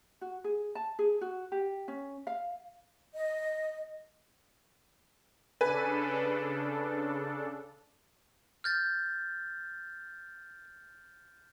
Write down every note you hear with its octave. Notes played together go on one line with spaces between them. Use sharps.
F#4
G#4
A5
G#4
F#4
G4
C#4
F5
D#5
C#3 D4 A4 B4 G#5
F6 G6 A6